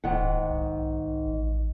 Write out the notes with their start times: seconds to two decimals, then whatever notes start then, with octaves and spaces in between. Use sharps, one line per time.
0.04 D1 G#2 D#3 F#5
0.50 B1
1.25 A1